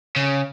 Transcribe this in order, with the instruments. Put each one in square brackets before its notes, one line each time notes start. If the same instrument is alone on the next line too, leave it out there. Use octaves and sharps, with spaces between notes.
[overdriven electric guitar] C#3